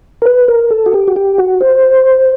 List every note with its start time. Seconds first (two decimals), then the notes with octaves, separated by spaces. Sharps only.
0.22 A#4
0.25 B4
0.48 A#4
0.71 A4
0.86 F#4
0.94 G4
1.08 F#4
1.16 G4
1.38 F#4
1.61 C5